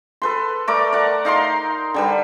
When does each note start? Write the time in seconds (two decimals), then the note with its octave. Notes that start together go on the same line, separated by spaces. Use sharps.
0.22 A4 B4 C6
0.68 A3 A#4 D5 D6
0.93 D5 F#5
1.25 D#4 F5 A#5 C6
1.94 D3 G3 B4